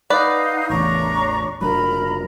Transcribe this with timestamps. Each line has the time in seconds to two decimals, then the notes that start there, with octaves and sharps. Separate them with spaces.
0.10 D#4 B4 D5 F5 F#5
0.70 A1 E2 D4 C#5 A#5 C#6
1.61 F1 F#3 D4 A#4 A#5 B5